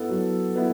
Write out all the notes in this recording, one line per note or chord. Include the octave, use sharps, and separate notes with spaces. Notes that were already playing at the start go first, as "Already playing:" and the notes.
Already playing: B3 E4 A4
F#3
B3 E4